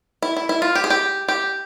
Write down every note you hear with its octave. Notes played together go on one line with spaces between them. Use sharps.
E4
E4
E4
F4
G4
G#4
G4
G4